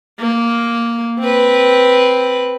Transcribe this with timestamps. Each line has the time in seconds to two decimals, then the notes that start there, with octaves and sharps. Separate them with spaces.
0.20 A#3
1.19 C4 B4